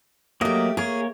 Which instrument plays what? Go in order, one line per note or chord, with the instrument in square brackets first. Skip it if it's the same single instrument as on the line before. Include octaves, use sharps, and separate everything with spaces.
[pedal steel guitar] F#3 A#3 D#5 [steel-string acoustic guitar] A3 G4
[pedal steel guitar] A#3 C#5 [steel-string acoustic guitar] G#4